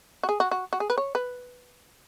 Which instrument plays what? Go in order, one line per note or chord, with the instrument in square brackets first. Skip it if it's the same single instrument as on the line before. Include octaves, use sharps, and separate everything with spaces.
[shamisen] F#4
G#4
F#4
F#4
F#4
G#4
B4
C#5
B4